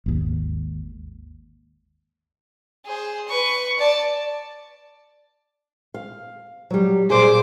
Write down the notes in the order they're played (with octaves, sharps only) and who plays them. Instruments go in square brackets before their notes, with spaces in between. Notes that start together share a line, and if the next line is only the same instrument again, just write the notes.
[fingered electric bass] G#1 D#2
[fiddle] G#4 C5
B4 C#6
D5 A5
[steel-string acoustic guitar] F5
F#3 G3
[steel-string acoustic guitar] A#2 A#3 G#4 [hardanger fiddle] C5 D6